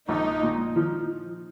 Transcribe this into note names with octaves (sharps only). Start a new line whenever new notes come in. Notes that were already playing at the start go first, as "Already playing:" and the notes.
A#1 D#4
A#2
F3